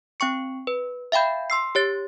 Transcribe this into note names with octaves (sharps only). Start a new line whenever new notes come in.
C4 G5 C#6 C#7
B4
E5 F5 G5 B5 G6
C6 E6 C7
G4 C#5 A6